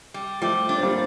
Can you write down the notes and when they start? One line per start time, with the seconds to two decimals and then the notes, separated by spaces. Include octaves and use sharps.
0.14 G3
0.42 F3 G3 A3
0.69 D4
0.78 C4
0.83 G3 A#3